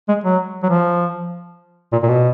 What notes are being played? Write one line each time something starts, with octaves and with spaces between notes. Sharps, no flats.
G#3
F#3
F#3
F3
A#2
A#2
B2